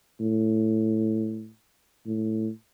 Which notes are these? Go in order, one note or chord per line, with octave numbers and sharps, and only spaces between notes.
A2
A2